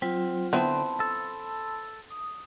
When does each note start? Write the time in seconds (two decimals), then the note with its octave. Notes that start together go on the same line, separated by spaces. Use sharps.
0.02 F#3 C4 F4
0.53 D3 B3 C4 E4 C5 A5 B5 C6
1.00 A4
2.10 D#6